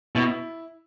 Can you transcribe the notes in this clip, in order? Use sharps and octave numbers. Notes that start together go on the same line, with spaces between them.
B2 E4